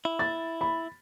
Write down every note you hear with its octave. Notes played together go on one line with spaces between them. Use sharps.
E4
A6
B5